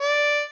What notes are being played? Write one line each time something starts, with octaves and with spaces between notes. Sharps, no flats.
D5